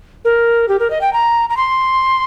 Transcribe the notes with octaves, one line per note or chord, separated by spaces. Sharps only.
A#4
G4
A#4
D#5
G5
A#5
A#5
C6